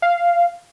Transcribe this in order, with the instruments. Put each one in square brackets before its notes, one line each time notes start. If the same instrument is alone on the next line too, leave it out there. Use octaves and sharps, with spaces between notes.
[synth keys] F5